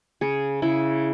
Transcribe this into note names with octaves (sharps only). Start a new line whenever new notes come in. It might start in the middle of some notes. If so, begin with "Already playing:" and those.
C#3 G#4
C#3 E4